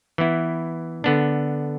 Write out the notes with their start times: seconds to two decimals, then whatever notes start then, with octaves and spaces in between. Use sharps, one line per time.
0.18 E3 B3 E4
1.04 D3 B3 D4